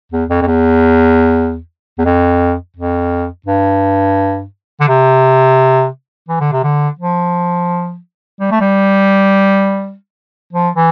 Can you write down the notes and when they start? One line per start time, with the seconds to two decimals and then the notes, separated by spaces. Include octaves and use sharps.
0.12 E2
0.30 F2
0.42 F2
0.47 E2
1.98 E2
2.05 F2
2.76 F2
3.46 G2
4.80 D3
4.88 C3
6.29 E3
6.40 D3
6.52 C3
6.63 D3
6.99 F3
8.40 G3
8.51 A3
8.61 G3
10.53 F3
10.76 E3